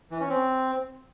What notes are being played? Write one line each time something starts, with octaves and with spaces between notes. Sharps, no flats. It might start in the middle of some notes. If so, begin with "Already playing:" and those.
E3
C#4
C4